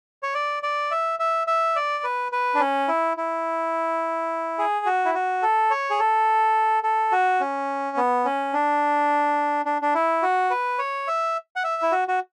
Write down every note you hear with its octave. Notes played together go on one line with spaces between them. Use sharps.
C#5
D5
D5
E5
E5
E5
D5
B4
B4
D4
C#4
E4
E4
G#4
F#4
E4
F#4
A4
C#5
G#4
A4
A4
F#4
C#4
B3
C#4
D4
D4
D4
E4
F#4
B4
C#5
E5
F#5
E5
E4
F#4
F#4